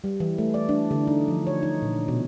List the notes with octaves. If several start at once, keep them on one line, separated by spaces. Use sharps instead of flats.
G3
E3
A3
D5
D4
D3
D#4
F3
C#5
D#4
A#2
B2